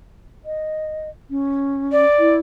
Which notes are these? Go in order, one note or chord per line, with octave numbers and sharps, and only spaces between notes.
D#5
C#4
D5
E4